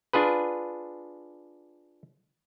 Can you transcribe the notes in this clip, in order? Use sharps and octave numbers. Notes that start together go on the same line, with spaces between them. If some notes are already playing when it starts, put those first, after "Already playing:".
D4 F4 G#4 B4